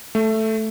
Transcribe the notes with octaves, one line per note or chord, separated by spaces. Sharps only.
A3